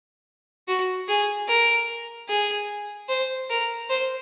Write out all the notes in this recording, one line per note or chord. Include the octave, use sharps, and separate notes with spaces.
F#4
G#4
A#4
G#4
C5
A#4
C5